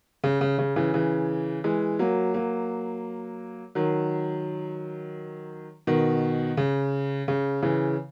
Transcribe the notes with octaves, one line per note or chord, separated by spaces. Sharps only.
C#3
C#3
C#3
C#3 E3
C#3 E3
E3 G#3
F#3 A#3
F#3 A#3
D#3 F#3
B2 D#3
C#3
C#3
C#3 E3